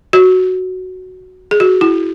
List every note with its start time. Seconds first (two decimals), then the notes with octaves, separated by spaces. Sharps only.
0.13 F#4
1.51 G#4
1.60 F#4
1.81 E4